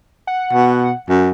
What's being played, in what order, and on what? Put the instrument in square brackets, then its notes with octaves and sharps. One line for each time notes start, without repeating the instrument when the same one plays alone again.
[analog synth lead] F#5
[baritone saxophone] B2
F#2